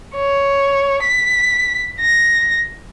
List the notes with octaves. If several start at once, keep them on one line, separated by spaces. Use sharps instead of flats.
C#5
B6
A#6